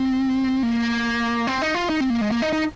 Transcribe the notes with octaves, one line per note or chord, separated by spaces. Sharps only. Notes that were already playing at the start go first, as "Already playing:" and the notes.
Already playing: C4
A#3
C4
D#4
F4
D#4
C4
A#3
G#3
A#3
D#4
D#4